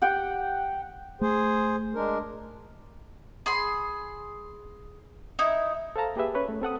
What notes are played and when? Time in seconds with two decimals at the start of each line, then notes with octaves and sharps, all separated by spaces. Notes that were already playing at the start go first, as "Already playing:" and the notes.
0.02 G4 F#5 G5
1.21 A3 G#4 C5
1.95 G#3 D4 A#4
3.46 G#4 B5 C6
5.39 D#4 E4
5.96 A4 C5 F5 A5 A#5
6.16 A#3 G4 G#4 B4 E5
6.34 C#4 B4 C#5
6.49 A3
6.61 C4 A4 F#5 D#6